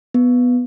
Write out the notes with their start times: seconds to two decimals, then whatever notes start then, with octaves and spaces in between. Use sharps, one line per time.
0.14 B3